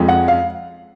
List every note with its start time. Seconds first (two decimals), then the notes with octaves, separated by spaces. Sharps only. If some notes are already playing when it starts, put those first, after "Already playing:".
Already playing: F2 F3 G#3
0.08 F#5
0.28 F5